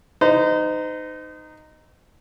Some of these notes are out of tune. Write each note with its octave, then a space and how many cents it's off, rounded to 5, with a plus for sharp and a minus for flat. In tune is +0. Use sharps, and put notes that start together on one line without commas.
D#4 -10 C5 -40